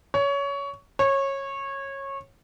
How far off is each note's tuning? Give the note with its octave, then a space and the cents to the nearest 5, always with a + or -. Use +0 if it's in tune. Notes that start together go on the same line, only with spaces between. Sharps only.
C#5 +20
C#5 -20